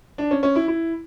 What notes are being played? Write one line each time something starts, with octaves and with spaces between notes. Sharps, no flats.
D4
C#4
C#4
E4
E4